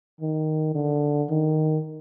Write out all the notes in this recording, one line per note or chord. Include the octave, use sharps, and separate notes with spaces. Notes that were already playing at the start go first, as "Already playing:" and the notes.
D#3
D3
D#3